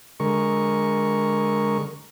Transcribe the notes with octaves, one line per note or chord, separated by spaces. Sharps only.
D3 G#3 A#4 C#6